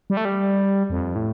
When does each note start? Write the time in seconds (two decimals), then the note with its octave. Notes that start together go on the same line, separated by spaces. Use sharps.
0.10 G3
0.17 A3
0.25 G3
0.90 F2
1.16 A2